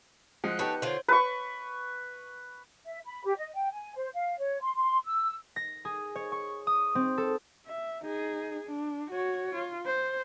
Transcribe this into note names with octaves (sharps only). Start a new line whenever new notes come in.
F3 G#3 F#5 F#6
B3 D4 D#4 G4 A4 C#5
D3 F4 C5 C#5
B4 C#6
E5
B5
G4
D#5
G5
G#5
C5
F5
C#5
C6
C6
E6
A#6
G#4
C#5
C#6
D#6
C4
A4
E5
D#4 G#4
D4
F#4 C#5
F4
C5